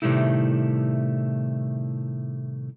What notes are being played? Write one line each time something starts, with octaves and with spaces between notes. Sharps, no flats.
A2 C3 D#3 G3 A3 E4